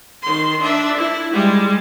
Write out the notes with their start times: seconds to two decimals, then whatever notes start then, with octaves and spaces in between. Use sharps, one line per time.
0.22 D#3 C6
0.61 D4 E5
0.97 E4
1.33 G3 G#3